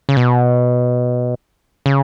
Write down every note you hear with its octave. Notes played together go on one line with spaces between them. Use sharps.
C#3
B2
C#3